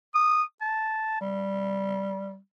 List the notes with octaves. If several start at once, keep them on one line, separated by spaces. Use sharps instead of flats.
D#6
A5
G3